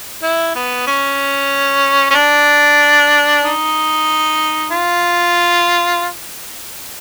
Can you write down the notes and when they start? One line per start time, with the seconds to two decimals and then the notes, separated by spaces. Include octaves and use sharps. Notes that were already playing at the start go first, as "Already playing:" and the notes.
0.23 E4
0.55 B3
0.87 C#4
2.11 C#4
2.15 D4
3.43 D#4
4.71 F4